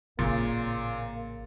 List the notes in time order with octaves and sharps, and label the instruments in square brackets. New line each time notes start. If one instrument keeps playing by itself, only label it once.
[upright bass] A1 C4 [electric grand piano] A#2 C6 A6 [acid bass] C#3 [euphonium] A#3